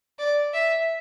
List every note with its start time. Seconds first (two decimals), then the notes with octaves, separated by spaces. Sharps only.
0.19 D5
0.54 E5